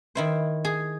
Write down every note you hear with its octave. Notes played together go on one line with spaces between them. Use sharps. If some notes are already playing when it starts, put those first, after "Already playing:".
D#3 E4 C5
G#4